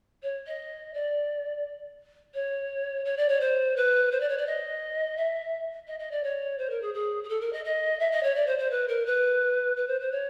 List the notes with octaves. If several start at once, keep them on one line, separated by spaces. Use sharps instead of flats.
C#5
D#5
D5
C#5
C#5
D5
C#5
C5
B4
C5
D5
C#5
D5
D#5
E5
D#5
D#5
D5
C#5
C5
A#4
G#4
G#4
G#4
A4
A#4
D#5
D#5
E5
D#5
C#5
D5
C5
C5
B4
A#4
B4
B4
C5
C5
C#5